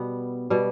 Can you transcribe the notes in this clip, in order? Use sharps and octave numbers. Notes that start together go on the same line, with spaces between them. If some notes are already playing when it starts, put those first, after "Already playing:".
Already playing: B2 G3 B3
B2 G3